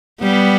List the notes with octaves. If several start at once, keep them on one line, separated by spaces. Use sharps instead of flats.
G3 B3